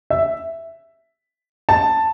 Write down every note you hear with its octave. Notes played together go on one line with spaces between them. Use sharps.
E5
A5